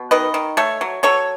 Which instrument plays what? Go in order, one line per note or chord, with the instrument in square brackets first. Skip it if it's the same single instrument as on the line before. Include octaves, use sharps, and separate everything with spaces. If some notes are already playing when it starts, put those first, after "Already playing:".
Already playing: [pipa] B2
D#3 B4 D#5
D#3
A3 A4 C#5
F#3
F#3 A4 C#5